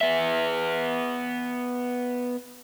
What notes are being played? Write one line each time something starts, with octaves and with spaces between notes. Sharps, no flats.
B3 E5